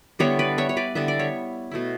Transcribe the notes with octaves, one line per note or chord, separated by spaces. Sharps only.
D3 G3 B3 E4 C#5 E5
B4 D5
C#5 E5
C#5
B4 D5
D3 G3 B3 E4 E5
D5
C#5 E5
B2 A3 E4